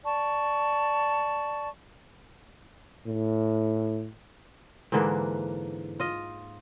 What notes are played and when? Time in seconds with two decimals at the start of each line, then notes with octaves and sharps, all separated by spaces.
0.04 D5 A5 C#6
3.07 A2
4.92 G#2 D3 E3 A#3
6.00 F4 D#5